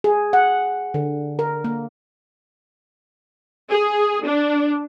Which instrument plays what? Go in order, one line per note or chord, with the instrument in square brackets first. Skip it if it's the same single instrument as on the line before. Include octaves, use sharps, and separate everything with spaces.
[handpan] G#4
F#5
D3
A#4
A#3
[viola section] G#4
D4